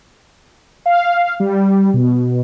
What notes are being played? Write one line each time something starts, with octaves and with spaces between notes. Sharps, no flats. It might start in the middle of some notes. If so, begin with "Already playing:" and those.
F5
G3
B2